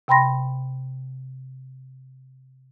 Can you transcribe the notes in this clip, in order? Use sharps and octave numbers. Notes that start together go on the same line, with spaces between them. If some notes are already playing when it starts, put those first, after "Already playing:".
C3 G5 B5 C6 A#6